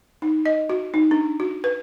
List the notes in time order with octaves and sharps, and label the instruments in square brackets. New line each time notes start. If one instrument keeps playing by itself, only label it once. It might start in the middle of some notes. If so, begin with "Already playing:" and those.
[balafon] D#4
D#5
F#4
D#4
D4
F#4
B4